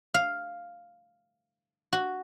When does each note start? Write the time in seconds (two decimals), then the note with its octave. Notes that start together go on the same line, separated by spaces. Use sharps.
0.14 F5
1.93 F#4